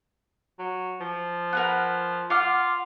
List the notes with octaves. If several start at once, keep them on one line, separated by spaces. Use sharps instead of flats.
F#3
F3
A#4 B4 F#5
F4 F#5 D6 F6